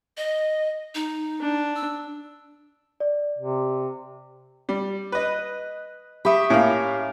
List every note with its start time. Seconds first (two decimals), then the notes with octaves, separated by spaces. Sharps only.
0.17 D#5
0.95 D#4
1.41 D4
1.76 E6
3.00 D5
3.38 C3
4.69 G3
5.12 B4 D#5
6.25 G4 E5 B5 C#6 D#6
6.50 A2 A#3 C#4 F5